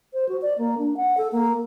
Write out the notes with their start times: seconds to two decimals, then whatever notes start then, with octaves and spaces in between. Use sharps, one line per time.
0.14 C5
0.29 F#4
0.42 D5
0.58 A#3
0.78 D4
0.97 F#5
1.17 A4
1.32 A#3